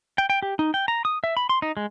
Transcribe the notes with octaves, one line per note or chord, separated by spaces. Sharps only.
G5
G5
G4
D#4
G5
A#5
D#6
E5
B5
C6
D#4
G#3